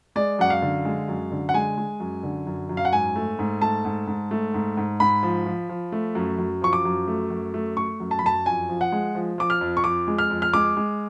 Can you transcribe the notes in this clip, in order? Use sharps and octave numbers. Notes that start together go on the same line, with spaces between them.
G#3 D5
F#2 F#5
F5
D3
G#3
F#2
D3
F#5
G#3 G#5
G#3
F#2
D3
F#2
F#2
F5
F#5
G#2 G#5
A3
G#2
A3 A5
G#2
G#2
A3
G#2
G#2
G#2 B5
F3
F3
F3
A3
F#2
F#2
F3 C#6
D6
F#2
A3
F#2
A3
A3 C#6
F#2
A5
B5
F#2 A5
F2 G#5
F3
F#5
G#3
F3
F3 D6
F6
F2
C#6
F2 D6
G#3
F6
F2
F6
G#3 D6
G#3